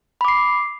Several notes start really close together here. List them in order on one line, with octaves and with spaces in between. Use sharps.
B5 D6 C7